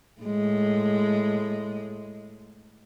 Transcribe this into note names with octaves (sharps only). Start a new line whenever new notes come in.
A2 G#3